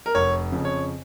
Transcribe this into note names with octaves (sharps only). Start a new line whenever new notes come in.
A#4
F1 C#5
F2 C#3
C#5